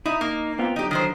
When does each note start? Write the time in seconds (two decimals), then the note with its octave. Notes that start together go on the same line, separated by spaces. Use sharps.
0.06 D#4 E4
0.21 A#3 D#4
0.59 B3 C4 F4
0.76 D3 F#3 D#4 G4
0.91 D#3 E3 C5